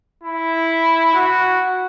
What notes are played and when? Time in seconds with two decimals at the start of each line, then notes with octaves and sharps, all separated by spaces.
0.24 E4
1.14 F#4